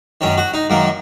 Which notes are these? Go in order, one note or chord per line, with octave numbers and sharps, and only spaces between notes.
F#2 D#3 C#4
F#4
D#4
F#2 D#3 A#3